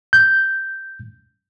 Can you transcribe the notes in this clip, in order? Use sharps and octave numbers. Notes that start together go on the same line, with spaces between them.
G6